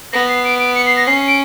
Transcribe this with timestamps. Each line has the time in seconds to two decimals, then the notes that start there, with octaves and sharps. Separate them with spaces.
0.13 B3 A#6
0.29 C7
0.44 D7
0.59 D7
0.75 C#7
0.86 C7
0.97 A#6
1.07 C#4 C7
1.28 D7